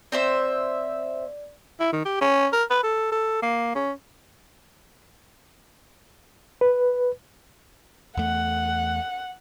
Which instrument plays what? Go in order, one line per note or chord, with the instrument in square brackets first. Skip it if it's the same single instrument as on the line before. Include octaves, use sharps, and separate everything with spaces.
[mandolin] C4 C5 E5 [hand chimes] D5
[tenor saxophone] E4
D#3
G4
C#4
A#4
B4
A4
A4
A#3
C#4
[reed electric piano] B4
[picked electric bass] E2 A3 [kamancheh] F#5